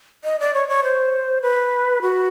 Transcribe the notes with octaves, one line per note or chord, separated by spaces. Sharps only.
D#5
D5
C#5
C#5
C5
B4
F#4